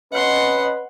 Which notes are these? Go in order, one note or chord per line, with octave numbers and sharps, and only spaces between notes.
C#4 B4 D#5 F#5 C6